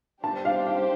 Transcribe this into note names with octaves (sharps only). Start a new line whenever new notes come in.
G3 D4 G4 C5 A5
F5
F5